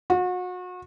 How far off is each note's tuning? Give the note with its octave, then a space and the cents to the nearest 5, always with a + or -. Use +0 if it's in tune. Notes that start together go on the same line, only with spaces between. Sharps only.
F#4 -35